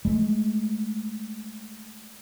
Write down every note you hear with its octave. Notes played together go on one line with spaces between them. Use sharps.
G#3 A3